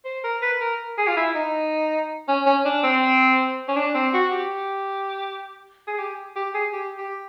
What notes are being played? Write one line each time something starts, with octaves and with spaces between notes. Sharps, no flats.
C5
A#4
B4
A#4
G#4
F4
E4
D#4
C#4
C#4
D4
C4
C#4
D4
C4
F#4
G4
G#4
G4
G4
G#4
G4
G4